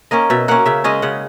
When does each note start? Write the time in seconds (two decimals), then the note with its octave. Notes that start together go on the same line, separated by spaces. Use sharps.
0.11 A#3 C#4 D#5
0.30 B2 E5
0.48 A#3 C#4 F#5
0.66 C#3 E5
0.84 G#3 C#4 D#5
1.02 C#3 F#5